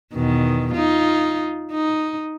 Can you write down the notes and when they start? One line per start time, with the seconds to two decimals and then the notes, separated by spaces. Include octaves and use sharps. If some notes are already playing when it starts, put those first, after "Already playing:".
0.14 E2 B2 D#3
0.74 D#4 F4
1.71 D#4